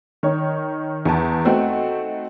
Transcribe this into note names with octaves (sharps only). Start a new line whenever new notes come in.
D#3 C#5
E2 A5
A3 C4 D#4 F#4